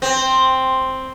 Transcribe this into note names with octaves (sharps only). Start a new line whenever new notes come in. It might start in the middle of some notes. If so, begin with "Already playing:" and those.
C4